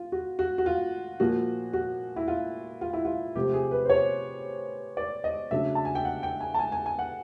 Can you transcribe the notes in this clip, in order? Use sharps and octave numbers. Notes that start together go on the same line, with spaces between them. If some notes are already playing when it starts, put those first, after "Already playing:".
Already playing: F4
F#4
F#4
F#4
F4
A#2 F3 A#3 F#4
F#4
E4
F4
F4
E4
F4
C3 F3 A3 C4 G4
G#4
B4
C5
C#5
D5
D#5
C#3 F#3 A3 D4 E5
A5
G#5
G5
F#5
G5
G#5
A5
G#5
G#5
G#5
F#5